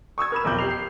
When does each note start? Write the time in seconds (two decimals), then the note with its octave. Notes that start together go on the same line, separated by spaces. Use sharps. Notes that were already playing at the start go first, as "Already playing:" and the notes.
0.18 C#6 D#6 E6 G#6
0.32 A#4 B5 E7
0.45 B1 F2 D6 G6 F#7
0.59 G4 C7 F7
0.71 C7